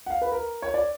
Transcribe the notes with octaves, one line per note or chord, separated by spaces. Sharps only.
F#5
F5
B4
A#4
C#5
D5